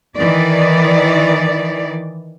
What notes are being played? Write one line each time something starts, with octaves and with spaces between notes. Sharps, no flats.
D#3 E3 D5